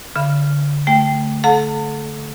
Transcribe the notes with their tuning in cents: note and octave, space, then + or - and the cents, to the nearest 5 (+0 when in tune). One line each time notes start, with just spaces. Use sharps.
D3 -25 F5 -35 B5 +0
A3 +0 G5 +0
A4 -30 F#5 -40 A5 +45